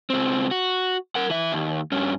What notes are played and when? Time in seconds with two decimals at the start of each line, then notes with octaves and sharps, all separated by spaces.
0.10 C#2 C4
0.51 F#4
1.15 A#4 F#5
1.30 E3 E5
1.52 D#2
1.92 G2 C#4